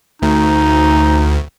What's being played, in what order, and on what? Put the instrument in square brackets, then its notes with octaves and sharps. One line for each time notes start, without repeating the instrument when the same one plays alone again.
[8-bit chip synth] D2 [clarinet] D#4